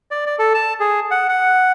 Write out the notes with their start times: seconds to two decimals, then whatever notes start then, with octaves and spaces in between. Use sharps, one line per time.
0.11 D5
0.26 D5
0.39 A4
0.54 A5
0.80 G#4
1.11 F#5
1.29 F#5